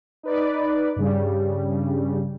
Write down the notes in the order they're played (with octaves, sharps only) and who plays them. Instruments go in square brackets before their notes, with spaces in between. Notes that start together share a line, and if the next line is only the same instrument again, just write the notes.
[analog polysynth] D#4 B4 D5
G2 C#3 G3